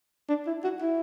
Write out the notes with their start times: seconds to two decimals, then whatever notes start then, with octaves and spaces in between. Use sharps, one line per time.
0.29 D4
0.47 E4
0.64 F#4
0.82 E4